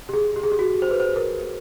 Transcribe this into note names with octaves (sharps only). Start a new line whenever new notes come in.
G4
G#4
G4
G#4
G4
F#4
C5
B4
C5
A#4